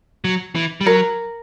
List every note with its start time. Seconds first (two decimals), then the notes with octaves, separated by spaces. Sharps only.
0.25 F#3
0.55 E3
0.81 G3
0.86 F#3 A#4